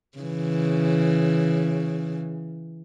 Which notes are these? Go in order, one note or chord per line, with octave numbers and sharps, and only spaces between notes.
C#3 E3